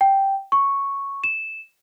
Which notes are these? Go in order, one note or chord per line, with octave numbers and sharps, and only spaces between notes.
G5
C#6
E7